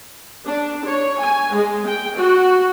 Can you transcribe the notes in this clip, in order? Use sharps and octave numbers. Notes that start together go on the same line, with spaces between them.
D4
C#5
G#5
G#3
G5
F#4